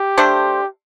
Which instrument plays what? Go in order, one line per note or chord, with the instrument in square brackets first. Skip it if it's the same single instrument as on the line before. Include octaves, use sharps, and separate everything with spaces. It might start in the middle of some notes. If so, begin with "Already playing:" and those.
Already playing: [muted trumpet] G4
[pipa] A3 D4 A4 C5